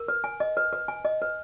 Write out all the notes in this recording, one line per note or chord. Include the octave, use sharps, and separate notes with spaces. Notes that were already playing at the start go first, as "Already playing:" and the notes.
Already playing: A#4
B4
G#5
D#5
B4
B4
G#5
D#5
B4